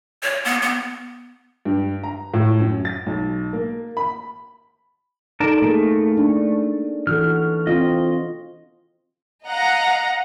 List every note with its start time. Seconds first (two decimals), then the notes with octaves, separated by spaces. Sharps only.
0.23 C#5
0.45 B3
0.62 B3
1.65 G2
2.04 A#5
2.34 A2
2.60 F#2
2.85 A6
3.06 B1
3.53 A#3
3.97 B5
5.40 D#4 A4 A#4 D5 A5
5.62 A3 A#3 G#4 A#4
6.17 D4
7.07 E3 F#4 A4 F6
7.67 C4 F4 D#5
9.46 D#5 F5 F#5 A#5